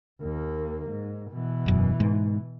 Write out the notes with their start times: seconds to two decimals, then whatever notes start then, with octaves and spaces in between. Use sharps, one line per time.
0.21 D#2 A#3
0.90 G#2
1.31 B2 E3
1.66 E1 F#2
2.00 G#2